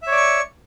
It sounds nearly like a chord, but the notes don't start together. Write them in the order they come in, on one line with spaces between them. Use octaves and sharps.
E5 C#5 D5 C#6